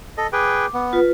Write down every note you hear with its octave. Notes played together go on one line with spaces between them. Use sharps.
A4 D#5
G#4 B4 G5 D6
B3
F4 B4